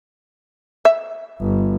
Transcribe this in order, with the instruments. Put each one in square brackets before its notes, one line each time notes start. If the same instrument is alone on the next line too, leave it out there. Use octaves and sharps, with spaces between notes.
[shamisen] E5
[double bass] G1